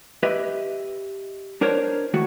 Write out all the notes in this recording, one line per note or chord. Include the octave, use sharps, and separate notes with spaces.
G4 B4 D#5 E5
D4 A#4 C5 C#5
D#3 A3 F#4